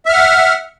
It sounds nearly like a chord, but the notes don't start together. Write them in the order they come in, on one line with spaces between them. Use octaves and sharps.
E5 F6 F#5